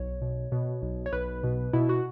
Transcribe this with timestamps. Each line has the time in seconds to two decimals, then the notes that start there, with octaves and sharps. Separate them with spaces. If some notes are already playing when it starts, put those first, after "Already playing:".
Already playing: B1 C#5
0.22 B2
0.52 B2
0.82 B1
1.06 C#5
1.13 B1 B4
1.44 B2
1.73 B2 E4
1.89 F#4